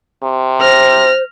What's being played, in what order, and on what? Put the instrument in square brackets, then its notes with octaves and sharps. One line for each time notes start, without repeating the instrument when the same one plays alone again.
[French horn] C3
[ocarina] C5 [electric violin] F6 A#6